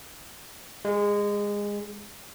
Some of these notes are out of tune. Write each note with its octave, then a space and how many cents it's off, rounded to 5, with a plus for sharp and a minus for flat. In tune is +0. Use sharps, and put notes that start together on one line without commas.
G#3 -20 G#4 +30